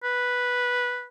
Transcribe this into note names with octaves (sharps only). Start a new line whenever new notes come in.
B4